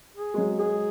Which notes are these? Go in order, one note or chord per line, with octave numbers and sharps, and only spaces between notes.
G#4
G#3
F#3
G#3 G#4